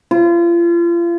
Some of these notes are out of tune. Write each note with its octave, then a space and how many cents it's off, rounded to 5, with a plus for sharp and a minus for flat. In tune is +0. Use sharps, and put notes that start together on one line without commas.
F4 -35